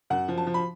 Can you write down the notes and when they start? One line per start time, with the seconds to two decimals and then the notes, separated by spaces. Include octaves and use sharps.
0.10 F#2 F#5
0.28 F3
0.38 A5
0.47 F3
0.54 B5